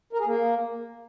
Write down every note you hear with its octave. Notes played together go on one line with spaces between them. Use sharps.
A#4
G#4
A#3